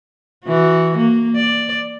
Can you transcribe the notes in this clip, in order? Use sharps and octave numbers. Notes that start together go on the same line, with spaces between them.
E3 F#4
A#3
D5